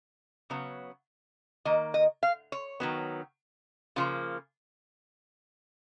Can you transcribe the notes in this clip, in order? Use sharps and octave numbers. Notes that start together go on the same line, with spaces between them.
C#3 F#3 B3
D#3 A#3 D#5
D#5
F5
C#5
D#3 F#3 B3
C#3 F3 A#3 F4